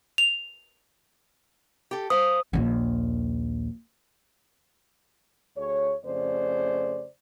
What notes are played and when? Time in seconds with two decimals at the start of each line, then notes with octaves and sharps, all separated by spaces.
0.18 F7
1.91 G4 A4
2.10 C5 F5 D#6
2.53 A#1 D#2
5.57 D2 G#4 C#5
6.05 F2 C#3 A3 C5 D5